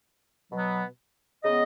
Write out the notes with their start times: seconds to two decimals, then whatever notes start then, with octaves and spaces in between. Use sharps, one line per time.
0.51 B2 F#3 B3
1.43 C#3 G#3 B3 D#5